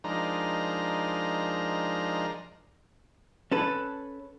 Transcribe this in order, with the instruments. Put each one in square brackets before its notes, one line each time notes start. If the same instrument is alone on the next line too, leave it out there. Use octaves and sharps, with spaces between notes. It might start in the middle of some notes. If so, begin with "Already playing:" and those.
[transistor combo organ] F3 G#3 D4 D#4 A#4 A#5
[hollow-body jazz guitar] C#4 A4 B4